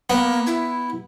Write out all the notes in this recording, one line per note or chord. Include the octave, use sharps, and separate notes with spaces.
A#3 B3
E4